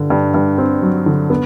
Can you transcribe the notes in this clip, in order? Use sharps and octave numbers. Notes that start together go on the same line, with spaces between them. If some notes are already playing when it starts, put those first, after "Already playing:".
Already playing: G2 D3
G2
G2
C4
F#3
D3
B3